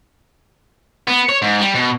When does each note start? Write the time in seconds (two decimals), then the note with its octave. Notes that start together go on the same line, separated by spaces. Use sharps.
1.07 B3
1.29 C#5
1.42 G#2
1.60 G3
1.75 B2